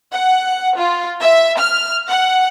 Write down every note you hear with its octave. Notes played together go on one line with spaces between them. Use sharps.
F#5
F4
E5
F6
F#5